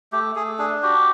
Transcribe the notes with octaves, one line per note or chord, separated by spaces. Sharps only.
A3 G4
A3 G#4
D4 G#4
F#4 G4